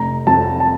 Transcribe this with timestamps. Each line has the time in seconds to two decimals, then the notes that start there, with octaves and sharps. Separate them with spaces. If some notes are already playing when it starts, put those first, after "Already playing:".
Already playing: F1 A#5
0.27 F2 A5
0.60 A5